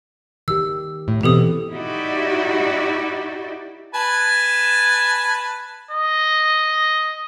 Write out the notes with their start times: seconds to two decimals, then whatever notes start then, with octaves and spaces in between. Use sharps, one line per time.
0.48 D#3 G4 E6
1.08 A2
1.23 B2 E3 C4 G4 A4 D#6
1.72 D#4 E4 F#4 G4 D5
3.95 B4 G#5 A5
5.91 D#5